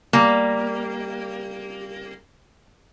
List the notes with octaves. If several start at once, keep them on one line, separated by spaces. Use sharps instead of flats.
G3 A#3